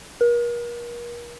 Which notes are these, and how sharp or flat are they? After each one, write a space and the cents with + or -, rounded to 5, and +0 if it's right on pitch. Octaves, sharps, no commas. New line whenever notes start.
A#4 +40